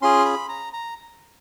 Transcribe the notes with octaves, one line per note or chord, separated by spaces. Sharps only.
C#4 F4 G#4 C6
B5
A#5
A#5